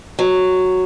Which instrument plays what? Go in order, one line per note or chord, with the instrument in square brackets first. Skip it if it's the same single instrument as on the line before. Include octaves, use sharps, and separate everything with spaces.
[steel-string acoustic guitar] F#3